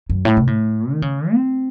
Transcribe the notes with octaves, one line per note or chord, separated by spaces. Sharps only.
F#2
A2
C3
A2
D#3
C#3
C4